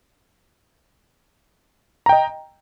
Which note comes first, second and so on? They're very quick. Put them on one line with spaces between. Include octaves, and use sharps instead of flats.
A#5 G5 D#5